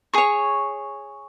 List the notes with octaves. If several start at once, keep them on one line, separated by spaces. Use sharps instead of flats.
G#4 C#5 C#6